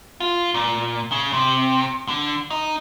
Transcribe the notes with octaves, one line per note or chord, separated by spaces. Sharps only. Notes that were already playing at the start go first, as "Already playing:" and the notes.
F4
A#2
C#3
C3
D3
D#4